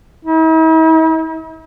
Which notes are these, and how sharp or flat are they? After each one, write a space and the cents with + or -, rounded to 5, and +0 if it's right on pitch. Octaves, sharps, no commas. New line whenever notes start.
E4 -45